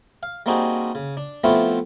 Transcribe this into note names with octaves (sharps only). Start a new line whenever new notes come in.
F5
G3 A#3 C4 D#4 F#4 G#4
C#3
D4
F3 A3 B3 C4 E4 F4